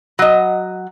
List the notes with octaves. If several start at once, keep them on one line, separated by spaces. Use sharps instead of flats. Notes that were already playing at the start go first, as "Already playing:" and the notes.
F#3 D#5